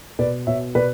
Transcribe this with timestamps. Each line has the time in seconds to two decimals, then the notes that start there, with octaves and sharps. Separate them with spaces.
0.19 B2 B4 D5
0.47 B2 C#5 E5
0.75 B2 B4 D5